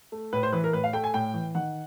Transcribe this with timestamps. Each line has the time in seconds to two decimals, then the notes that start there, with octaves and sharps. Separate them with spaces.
0.12 A3
0.33 A2 B4
0.43 C5
0.53 E3 B4
0.64 A#4
0.73 A2 B4
0.84 F5
0.93 A3 G5
1.04 G#5
1.14 A2 G5
1.34 E3
1.55 D#3 F#5